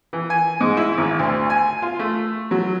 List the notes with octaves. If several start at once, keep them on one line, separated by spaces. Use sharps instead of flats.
E3
G#5
G#2
E4
G#1
D2
G#5
F4
A3
F#3